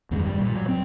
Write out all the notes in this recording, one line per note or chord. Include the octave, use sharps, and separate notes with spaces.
E2 G2 D#3 G#3
G3
A#2
F#3
C4